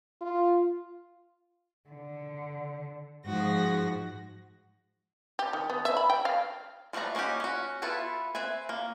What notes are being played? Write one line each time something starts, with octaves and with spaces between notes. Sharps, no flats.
F4
D3
G#2 F3 G#3 F#4 A#6
G4
D#3
B3
E5
B5
G5
F5
F3 G3 A3 B3 A#5
A#3 C#4 D#4 F#4 G4
C#4 F#4
B3 E4 F4 A4 B4
C4 B4 E5 G#5
A#3